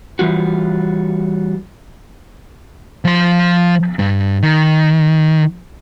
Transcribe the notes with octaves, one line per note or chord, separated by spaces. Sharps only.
E3 G3 F4 F#4
F3 C6
G2
D#3